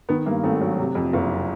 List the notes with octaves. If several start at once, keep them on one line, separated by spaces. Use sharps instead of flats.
D#3 B3
G2 A#3
G#1 A3
F#3
C3
F2
F#1